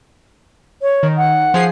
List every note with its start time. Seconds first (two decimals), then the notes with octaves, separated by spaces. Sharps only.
0.82 C#5
1.03 D#3
1.17 F#5
1.54 F3 G#4 C7